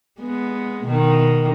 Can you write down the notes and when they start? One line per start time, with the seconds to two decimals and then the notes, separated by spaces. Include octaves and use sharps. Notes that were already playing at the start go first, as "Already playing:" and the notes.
0.20 G#3 B3
0.84 B2 D#3